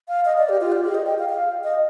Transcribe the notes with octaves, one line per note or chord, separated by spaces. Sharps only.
F5
D#5
D5
G4
F4
G4
G#4
D#5
G5
F5
F5
D#5